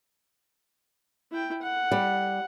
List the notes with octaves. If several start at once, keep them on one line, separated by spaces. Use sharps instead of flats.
E4 G5
F#5
G3